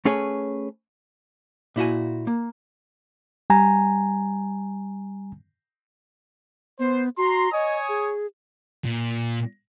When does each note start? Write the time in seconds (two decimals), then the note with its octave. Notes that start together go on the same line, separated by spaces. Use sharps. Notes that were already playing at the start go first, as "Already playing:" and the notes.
0.05 A3 C#4 G#4 B4 C#5
1.76 A#2 E4 F#4 G#5
2.27 A#3
3.50 G3 G#5 A#5
6.79 B3 C5
7.17 F#4 A#5 C6
7.53 C#5 D#5 G#5 D#6
7.89 G#4
8.84 A#2